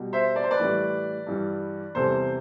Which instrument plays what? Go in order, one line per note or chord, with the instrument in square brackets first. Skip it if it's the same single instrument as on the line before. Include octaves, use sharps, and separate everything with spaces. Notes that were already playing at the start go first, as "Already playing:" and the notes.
Already playing: [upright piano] B2 G3
C5 E5
D5
C5
B4 D5
A2 E3 G3
G2 E3 G3
E2 C3 G3 A4 C5